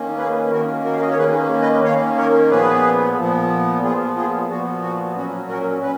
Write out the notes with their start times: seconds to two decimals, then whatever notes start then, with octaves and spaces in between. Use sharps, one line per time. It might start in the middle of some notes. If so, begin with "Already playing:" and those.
Already playing: D#3 A#3 C#4
0.18 G#4 B4
0.51 D#3 A#3 C#4 F#4 A#4
0.85 F#4 A#4
0.93 F5
1.02 D#5
1.10 C#5
1.18 D#3 A#3 C#4 G#4 B4
1.62 B4 D#5
1.84 D#3 A#3 C#4 C#5 F5
2.18 A#4 C#5
2.50 A#2 F3 B3 G#4 B4
3.18 A#2 F3 B3
3.83 A#2 F3 B3 F4 G#4
4.16 F4 G#4
4.49 A#2 F3 B3 F#4
4.82 F#4
5.16 A#2 F#3 C#4 F#4
5.49 F#4 A#4
5.82 C#4 B4